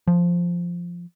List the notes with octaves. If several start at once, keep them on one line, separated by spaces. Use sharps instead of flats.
F3